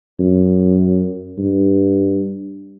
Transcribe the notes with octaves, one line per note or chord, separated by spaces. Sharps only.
F#2
G2